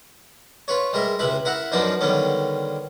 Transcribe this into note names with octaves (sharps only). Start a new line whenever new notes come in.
F4 B4 C#5
G3 G#3 A#4 E5
C#2 C3 E4 B4 E5 B5
E4 A#4 E5 F#5 B5
F#2 F3 B3 D4 D#4 C5
D3 D#3 G3 B3 C#4